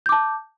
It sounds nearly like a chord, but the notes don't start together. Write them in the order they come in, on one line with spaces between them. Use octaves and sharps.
G6 D6 A5